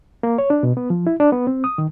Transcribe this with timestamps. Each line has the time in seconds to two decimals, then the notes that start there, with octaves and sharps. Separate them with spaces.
0.23 A#3
0.38 C#5
0.50 D4
0.63 B2
0.77 B3
0.90 F3
1.07 E4
1.20 D4
1.32 B3
1.47 C4
1.64 D#6
1.78 D#3